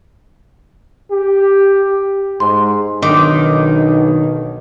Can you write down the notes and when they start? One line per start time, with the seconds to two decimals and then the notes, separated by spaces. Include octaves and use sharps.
1.11 G4
2.40 G#2 C6
3.02 B1 D#3 D4 D#5 D6